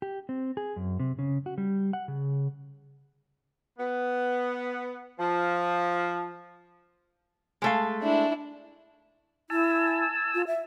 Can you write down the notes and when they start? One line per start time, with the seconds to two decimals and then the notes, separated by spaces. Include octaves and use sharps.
0.02 G4
0.29 C4
0.57 G#4
0.76 F#2
0.99 C3
1.19 C#3
1.46 F#4
1.58 G3
1.93 F#5
2.08 C#3
3.79 B3
5.19 F3
7.62 G#3 A3 F5
8.02 D4 E4
9.50 E4 G#5 A5 E6
10.34 F4
10.47 E5